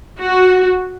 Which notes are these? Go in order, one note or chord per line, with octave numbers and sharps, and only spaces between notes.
F#4